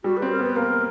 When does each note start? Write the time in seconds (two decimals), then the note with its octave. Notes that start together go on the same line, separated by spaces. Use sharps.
0.04 G3 F#4
0.17 B4
0.22 C4
0.31 A#4
0.39 B3 B4
0.56 A#3 A#4